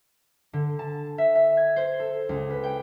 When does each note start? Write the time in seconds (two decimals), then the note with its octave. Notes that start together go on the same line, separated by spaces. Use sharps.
0.53 D3
0.79 A5
1.18 E5
1.35 E5
1.57 G#6
1.76 C5
2.00 A4
2.29 C#2
2.50 B4
2.63 G5